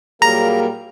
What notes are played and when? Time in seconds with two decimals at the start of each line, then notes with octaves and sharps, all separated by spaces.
0.22 A#2 F#3 G3 A#3 G#4 A#4 A#5